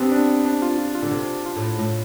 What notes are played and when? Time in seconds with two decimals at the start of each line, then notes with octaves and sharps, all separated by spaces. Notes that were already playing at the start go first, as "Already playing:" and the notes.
Already playing: C3 B3 C4 D4
0.11 D4
0.45 D4
0.62 F4
0.78 F4
0.95 F4
1.02 D3
1.11 C3
1.46 F4
1.56 A2
1.79 A2